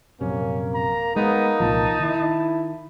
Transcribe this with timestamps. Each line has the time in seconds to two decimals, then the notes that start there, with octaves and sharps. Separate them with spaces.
0.21 A#1 F#2 C3 A#3 C#4
0.74 A#5
1.16 G#3 A#3 B3 D#4
1.60 C2 A#2 F3 A5
2.00 D#3 E4